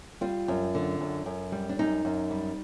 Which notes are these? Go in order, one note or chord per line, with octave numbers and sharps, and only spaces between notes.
G3 F4
F#2
D3
F#2
F#2
G3
D4
F#2 D#4
F#2
G3